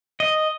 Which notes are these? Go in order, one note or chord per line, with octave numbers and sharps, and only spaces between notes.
D#5